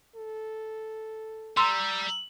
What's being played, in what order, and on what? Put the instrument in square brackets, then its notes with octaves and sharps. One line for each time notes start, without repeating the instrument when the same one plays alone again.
[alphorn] A4
[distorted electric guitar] G3 [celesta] A#5 E6 [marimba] C6